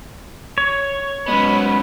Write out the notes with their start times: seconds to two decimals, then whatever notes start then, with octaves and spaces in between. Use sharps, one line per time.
0.58 C#5
1.28 B2 F#3 G#3 B3 C#4 B4